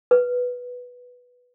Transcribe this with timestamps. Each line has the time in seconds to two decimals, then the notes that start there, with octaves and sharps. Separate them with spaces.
0.11 B4